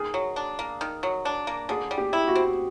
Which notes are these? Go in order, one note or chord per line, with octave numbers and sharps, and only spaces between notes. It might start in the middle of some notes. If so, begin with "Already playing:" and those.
Already playing: D#3 G#4
F#3
D4
A#3
D#3
F#3
D4
A#3
D3 G#4
G3
G4
E4
F#4
C4